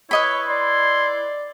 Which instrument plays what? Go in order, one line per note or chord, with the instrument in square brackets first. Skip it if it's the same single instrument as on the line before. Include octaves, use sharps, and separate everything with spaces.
[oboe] E4 [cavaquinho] B4 D#5 B5 [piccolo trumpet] C#5
[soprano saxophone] D5 [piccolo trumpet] C6